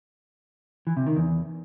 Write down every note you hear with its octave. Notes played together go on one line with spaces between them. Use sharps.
E3
C3
D#3
E2